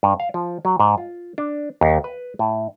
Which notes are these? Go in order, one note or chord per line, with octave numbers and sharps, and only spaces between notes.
G2
F5
F3
F#3
G#2
F4
D4
D#2
B4
A2